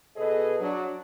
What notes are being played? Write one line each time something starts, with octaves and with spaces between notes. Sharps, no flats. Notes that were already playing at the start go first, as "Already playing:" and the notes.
B2 G#4 A4 B4 D#5
F#3 D4